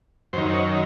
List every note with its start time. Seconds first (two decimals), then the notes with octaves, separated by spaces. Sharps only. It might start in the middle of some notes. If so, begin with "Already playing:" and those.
0.33 F#2 D#3 C5
0.53 C#5